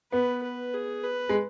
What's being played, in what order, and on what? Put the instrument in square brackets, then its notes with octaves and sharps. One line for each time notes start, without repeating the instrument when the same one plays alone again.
[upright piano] B3 [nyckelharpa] B4
[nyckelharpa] B4
G#4
B4
[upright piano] G#3